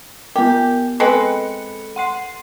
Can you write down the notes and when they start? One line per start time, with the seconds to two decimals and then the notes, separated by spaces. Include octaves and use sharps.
0.36 B3 G4 A#4
1.00 G#3 C4 A4 B4 C#7
1.96 F#5 C6 C7